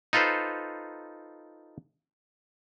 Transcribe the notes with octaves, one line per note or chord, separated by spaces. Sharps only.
D#4 F4 A4 B4 C5